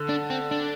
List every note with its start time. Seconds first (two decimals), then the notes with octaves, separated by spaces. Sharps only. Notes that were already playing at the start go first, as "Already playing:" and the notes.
Already playing: D3
0.09 D4
0.30 C4
0.51 D4